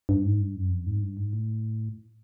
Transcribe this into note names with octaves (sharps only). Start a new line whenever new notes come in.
G2
G#2
G2
F#2
F2
G#2
G2
G#2
A2